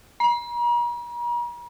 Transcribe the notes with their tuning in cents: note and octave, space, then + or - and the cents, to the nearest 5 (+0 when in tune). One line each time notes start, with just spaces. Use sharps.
A#5 +45